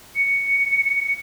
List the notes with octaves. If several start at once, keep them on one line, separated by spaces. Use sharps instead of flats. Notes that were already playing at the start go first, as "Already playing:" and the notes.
C#7